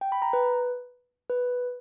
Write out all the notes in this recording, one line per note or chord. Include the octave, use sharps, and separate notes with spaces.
G5
B5
A#5
B4
B4